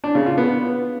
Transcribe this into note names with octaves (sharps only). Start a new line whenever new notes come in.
D4
C#3
F4
B3